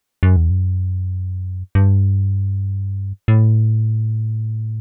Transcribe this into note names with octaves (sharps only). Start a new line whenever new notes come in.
F#2
E2
F#2
G2
A2